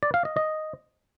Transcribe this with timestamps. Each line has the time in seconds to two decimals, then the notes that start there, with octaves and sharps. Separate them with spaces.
0.03 D5
0.14 F5
0.25 D#5
0.37 D#5